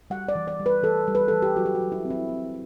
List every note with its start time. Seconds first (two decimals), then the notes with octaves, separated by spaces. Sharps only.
0.10 G3 F#5
0.28 D5
0.35 E3
0.48 D5
0.60 G3
0.66 B4
0.83 E3 A4
1.08 G3
1.15 B4
1.28 E3 A4
1.42 G4
1.56 F#3 F#4
1.66 G4
1.75 F#4
1.81 F#3
1.92 E4
2.05 C4
2.10 E4
2.29 C4